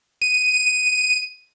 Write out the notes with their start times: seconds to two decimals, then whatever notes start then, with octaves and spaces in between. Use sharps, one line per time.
0.22 D#7